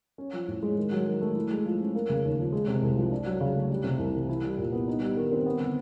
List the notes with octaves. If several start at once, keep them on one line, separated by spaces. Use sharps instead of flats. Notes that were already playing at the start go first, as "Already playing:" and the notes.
C#4
F3
A2
G#3
D#3
F#3
D#3
A3
E4
G#3
F3
C#4
A#3
C#3
D#2
F3
G#3
C3
C2
F3
D4
F#3
C#3
A3
G3
C3
C2
E3
E4
G3
A#2
B3
D#4
G3
D#3
C4
B3
D3